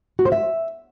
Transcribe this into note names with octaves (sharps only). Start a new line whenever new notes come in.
F#4
C5
E5